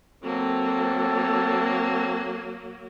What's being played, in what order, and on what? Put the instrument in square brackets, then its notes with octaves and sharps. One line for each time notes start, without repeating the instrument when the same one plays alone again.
[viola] F#3 A#3 [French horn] C4 [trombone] A4